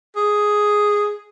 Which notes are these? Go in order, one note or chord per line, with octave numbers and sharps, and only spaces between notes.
G#4